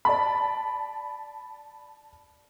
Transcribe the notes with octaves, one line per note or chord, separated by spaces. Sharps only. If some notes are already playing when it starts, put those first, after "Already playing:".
D5 A5 B5